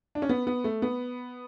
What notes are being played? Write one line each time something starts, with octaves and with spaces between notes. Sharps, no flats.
D4
C#4
B3
B3
A3
B3